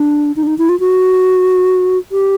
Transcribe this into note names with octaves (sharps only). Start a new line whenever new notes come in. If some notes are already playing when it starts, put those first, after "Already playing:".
Already playing: D4
D#4
D4
D#4
E4
F4
F#4
G4